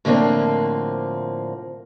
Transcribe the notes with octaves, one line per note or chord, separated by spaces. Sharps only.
A2 D3 F3 A#3 C4